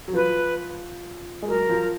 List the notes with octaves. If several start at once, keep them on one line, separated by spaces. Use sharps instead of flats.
F#3
F3 B4
G#3
F#3 A#4
F3